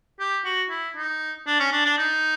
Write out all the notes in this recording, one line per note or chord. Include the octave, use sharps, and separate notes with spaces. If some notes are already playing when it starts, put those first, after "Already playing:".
G4
F#4
E4
D#4
D4
C#4
D4
D4
D#4